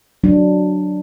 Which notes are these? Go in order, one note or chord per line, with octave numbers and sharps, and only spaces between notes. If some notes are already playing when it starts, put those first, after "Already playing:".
F#3 D4